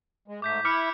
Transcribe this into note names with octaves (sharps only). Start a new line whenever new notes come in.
G#3
G#2 A3 D6 G6 B6
E4 B5 D6 F6 C#7